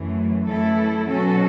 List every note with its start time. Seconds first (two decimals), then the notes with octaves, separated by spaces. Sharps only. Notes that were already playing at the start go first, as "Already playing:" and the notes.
Already playing: F#2 E3 A3
0.47 F#2 E3 A3 E4 A4
1.08 B2 F#3 C#4 F#4 A4